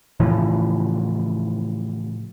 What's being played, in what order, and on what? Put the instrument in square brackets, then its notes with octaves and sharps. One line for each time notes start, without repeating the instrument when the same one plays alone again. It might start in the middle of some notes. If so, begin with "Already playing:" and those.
[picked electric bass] A2 C#3 E3 F3